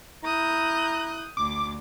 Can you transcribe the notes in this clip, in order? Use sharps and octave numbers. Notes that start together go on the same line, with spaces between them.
E4 A#5 D#6 F#6 G6
D2 D6